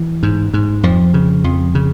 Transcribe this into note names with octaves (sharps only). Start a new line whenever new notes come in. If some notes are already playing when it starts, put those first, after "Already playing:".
Already playing: E3
G#2
G#2
F2 F3
C#3
F2
C#3